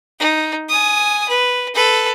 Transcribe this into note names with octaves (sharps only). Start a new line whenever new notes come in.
D#4
G#5 D#6
B4
A4 B4